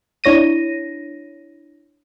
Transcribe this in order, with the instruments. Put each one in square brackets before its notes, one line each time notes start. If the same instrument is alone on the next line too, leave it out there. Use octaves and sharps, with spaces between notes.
[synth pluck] D4 E4 C#5 A#6 D#7